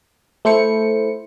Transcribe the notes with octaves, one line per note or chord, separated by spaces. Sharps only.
A3 E4 C5 C#7